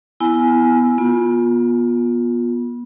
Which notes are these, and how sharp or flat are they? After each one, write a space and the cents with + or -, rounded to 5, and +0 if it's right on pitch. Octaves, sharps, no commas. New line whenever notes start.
B3 +10 E4 +0 G#5 +10
B3 -30 F4 +20